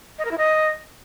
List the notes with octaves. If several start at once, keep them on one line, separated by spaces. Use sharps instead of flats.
D#5
A#4
E4
D#5